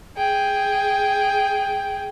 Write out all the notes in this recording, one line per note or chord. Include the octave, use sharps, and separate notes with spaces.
G#4 G5